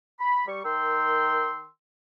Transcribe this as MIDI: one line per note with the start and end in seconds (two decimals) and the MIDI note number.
0.19 0.47 83
0.47 0.61 55
0.47 0.61 85
0.64 1.68 51
0.64 1.68 70
0.64 1.68 79
0.64 1.68 84
0.64 1.68 88